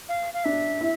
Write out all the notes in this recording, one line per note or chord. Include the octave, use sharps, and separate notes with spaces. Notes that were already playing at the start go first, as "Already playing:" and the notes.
F5
F5
D4 E5
E4